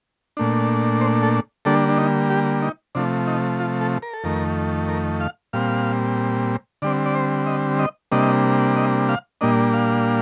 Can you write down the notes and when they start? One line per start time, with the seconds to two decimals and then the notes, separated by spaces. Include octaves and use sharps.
0.37 A#2 A3 D4
1.01 C5
1.23 A4
1.65 D3 G3 A#3 D4 A4
1.89 D4
1.97 D#4
2.30 G4
2.62 D#4
2.95 C3 F3 A3 D4
3.27 D#4
3.60 F4
3.81 A4
4.02 A#4
4.13 A4
4.24 F2 D#3 A3 A#4
4.88 A#4
5.20 F5
5.53 A#2 G3 C4 F5
6.82 D3 G3 C4 D5
7.06 D5
7.15 C5
7.47 D#5
7.79 D#5
8.12 C3 G3 A#3 D4 D#5
8.76 D#5
9.09 F5
9.41 A#2 G3 A#3 D4 D#5
9.74 F5